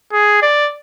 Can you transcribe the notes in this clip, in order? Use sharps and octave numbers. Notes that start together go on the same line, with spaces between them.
G#4
D5